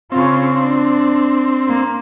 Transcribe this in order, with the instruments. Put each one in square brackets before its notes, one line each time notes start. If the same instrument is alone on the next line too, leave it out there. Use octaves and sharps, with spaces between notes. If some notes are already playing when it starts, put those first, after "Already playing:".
[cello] C#3 F4 [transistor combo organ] C4
[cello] D4
A#3